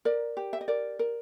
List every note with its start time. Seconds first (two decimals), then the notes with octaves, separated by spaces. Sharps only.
0.05 A#4 D5
0.37 G4
0.53 E5
0.61 D#5
0.68 A#4 D5
0.99 A#4